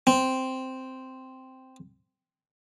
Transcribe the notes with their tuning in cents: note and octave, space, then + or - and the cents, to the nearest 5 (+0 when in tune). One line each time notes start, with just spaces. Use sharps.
C4 -5